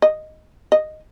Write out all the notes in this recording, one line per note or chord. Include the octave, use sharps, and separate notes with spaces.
D#5
D#5